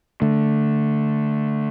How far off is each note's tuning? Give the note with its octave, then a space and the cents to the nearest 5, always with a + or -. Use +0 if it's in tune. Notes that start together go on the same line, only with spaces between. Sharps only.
D3 +0 A3 +0